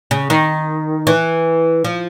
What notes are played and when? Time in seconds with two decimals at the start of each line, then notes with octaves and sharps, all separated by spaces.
0.11 C#3
0.30 D#3
1.07 E3
1.84 F3